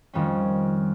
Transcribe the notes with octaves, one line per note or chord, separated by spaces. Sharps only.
F2 D#3 G3 C#4